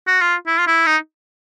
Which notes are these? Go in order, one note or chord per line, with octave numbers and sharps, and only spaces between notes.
F#4
F4
E4
F4
E4
D#4